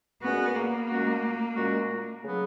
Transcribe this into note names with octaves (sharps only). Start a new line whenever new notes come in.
A#2 G#3 B3 C#4 F#4
A#3
A#2 G#3 C#4 F#4
A#2 G#3 C#4 F#4
C#3 F#3 B3